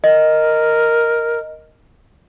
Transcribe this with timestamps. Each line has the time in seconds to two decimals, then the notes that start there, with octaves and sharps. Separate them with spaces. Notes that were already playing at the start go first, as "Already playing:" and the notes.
0.04 A#4 D#5